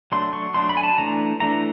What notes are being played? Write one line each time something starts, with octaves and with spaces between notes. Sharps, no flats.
F#3 A3 D4 C6
C#6
F#3 A3 D4 C6
B5
G#5
A5
E3 A3 D4 A#5
E3 A3 D4 A#5